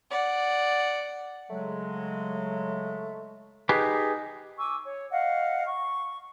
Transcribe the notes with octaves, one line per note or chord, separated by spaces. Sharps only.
D5 F#5
C#3 F#3 G#3 A3
D#4 G4 G#4 B4
G#5 C#6 D6 E6
C#5
D#5 F5 F#5
C#6